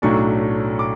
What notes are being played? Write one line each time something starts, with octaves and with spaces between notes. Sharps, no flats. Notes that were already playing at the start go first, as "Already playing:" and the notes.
B1 A2 F#3 A3 D4 C#6
D6